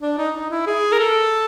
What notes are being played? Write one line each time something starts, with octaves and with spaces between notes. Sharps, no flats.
D4
D#4
D#4
E4
G#4
A#4
A4